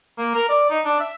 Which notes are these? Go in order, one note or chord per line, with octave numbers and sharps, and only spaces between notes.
A#3
A#4
D5
D#4
D4
E5